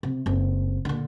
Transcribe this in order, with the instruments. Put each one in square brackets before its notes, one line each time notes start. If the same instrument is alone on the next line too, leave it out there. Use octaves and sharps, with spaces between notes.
[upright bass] C3
F#1 C4
A#2 D3